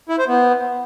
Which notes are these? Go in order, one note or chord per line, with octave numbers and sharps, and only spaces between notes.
E4
C5
B3